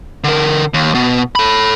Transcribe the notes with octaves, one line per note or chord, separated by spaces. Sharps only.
D3 A#4
D#2
B2
A4 B5